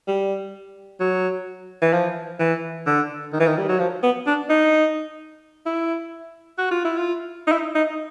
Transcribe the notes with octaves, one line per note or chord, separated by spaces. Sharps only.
G3
F#3
E3
F3
E3
D3
D#3
E3
D#3
G3
F#3
F3
B3
D4
D#4
E4
F#4
F4
E4
F4
D#4
E4
D#4